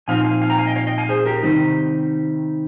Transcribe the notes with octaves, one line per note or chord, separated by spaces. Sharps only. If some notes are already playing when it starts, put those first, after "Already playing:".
A#2 F3 C4 D#4 F5 G#5
F5 G#5
F5 G#5
G5 A#5
F5 G#5
D#5 G5
C#5 F5
D#5 G5
F5 G#5
G#4 C5
G4 A#4
C3 D#3 G3 C4 D#4